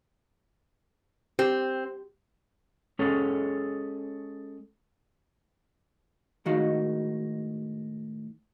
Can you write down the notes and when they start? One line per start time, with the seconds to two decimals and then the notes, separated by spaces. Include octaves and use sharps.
1.39 C4 G4
2.99 G#3 C#4 G#4 A4 C#5
6.46 A2 D#3 G#3 D#4 F#4 F5